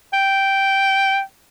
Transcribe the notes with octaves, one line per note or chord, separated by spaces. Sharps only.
G5